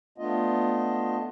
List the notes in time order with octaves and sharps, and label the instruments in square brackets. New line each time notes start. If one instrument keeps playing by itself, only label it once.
[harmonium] A3 B3 D4 F4 D#5